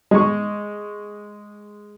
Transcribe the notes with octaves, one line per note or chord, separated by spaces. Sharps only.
G#3 C#6